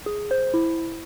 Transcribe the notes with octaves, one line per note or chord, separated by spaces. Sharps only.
G#4
C5
E4